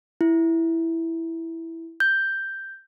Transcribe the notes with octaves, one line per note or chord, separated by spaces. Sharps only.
E4
G6